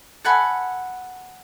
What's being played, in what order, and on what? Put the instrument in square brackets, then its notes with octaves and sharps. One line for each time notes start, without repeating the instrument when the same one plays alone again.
[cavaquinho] A4 F#5 G#5 B5